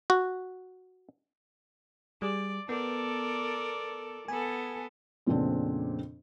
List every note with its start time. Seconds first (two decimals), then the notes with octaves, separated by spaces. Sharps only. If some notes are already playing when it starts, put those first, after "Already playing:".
0.10 F#4
2.22 G3 G#4 D5
2.69 B3 A4 A#4 D5
4.28 B3 A4 G#5
5.27 F2 A#2 C#3 B3 C4 D4